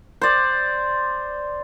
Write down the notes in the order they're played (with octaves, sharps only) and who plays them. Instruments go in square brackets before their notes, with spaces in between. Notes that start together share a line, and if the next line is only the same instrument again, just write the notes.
[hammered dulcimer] C5 D5